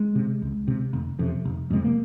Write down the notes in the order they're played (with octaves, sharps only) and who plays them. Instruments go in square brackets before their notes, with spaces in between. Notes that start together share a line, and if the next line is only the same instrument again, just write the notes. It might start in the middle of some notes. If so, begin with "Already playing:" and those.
Already playing: [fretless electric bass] G#3
C3
C#2
C3
F1
F2 C3
F1
F2 C3 G#3
A#3